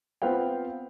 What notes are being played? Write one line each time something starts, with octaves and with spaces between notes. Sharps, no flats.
B3 C4 F4 B4 F5 G5